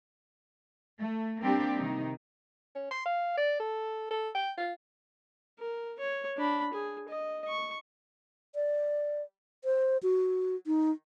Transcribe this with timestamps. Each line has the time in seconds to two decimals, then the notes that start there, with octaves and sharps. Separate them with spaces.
0.98 A3
1.41 G3 A#3 C4 D4 G4
1.78 C3 D#3 D#4
2.75 C#4
2.91 C6
3.06 F5
3.37 D5
3.60 A4
4.11 A4
4.35 G5
4.58 F4
5.59 A#4
6.00 C#5
6.37 D4 B5
6.73 G#4
7.09 D#5
7.48 C#6
8.55 D5
9.64 C5
10.03 F#4
10.67 D#4